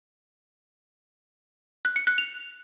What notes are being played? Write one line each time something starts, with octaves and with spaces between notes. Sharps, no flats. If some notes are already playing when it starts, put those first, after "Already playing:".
F#6
C#7
F#6
F7